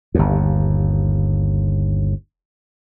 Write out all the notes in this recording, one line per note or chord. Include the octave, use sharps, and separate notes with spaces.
G1 D#2